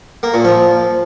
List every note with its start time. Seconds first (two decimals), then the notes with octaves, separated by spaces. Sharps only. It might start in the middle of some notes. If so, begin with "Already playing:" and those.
0.23 A#3
0.34 A#2
0.44 F3